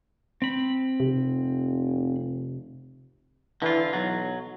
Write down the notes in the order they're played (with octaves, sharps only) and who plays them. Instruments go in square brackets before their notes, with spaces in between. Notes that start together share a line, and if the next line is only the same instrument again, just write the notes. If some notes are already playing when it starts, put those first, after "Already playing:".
[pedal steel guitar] C4 B5
[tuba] F1 [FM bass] C3
[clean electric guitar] D3 F4 [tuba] E3
[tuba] B1 [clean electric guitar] F#3